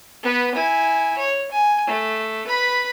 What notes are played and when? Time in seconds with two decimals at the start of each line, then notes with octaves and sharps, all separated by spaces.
0.23 B3 B4
0.55 E4 G#5
1.18 C#5
1.51 G#5
1.87 A3
2.47 B4 B5